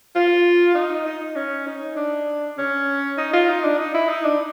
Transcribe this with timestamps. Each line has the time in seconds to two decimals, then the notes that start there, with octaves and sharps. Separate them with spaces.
0.15 F4
0.75 D#4
1.06 D#4
1.35 C#4
1.67 D#4
1.96 D4
2.58 C#4
3.17 D#4
3.33 F4
3.48 D#4
3.64 D4
3.78 D#4
3.94 E4
4.09 D#4
4.24 D4